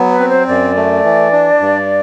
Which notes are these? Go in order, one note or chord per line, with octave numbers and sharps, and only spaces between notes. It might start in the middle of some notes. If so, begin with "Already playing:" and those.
Already playing: F#3 B3
B4
C4
C5
F#2 D5
A3
E3
D4
G2